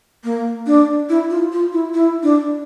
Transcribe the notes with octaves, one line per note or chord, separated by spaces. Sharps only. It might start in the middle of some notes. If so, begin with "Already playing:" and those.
A#3
D4
E4
F4
F4
E4
E4
D4